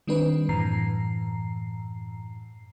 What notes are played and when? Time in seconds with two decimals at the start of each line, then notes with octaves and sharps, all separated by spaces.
0.07 D#3 G3 C4 D4 B4
0.49 F#2 A2 E3 A#5 C7